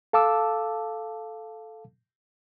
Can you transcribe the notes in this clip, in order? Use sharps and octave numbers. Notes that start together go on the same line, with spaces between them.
A4 F5 A5 D6 E6